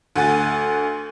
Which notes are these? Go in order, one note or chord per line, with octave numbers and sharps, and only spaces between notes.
D2 F#5 G#5 A6